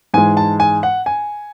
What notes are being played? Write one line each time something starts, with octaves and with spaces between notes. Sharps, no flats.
G#2 E3 G#3 G#5
A5
G#5
F#5
G#5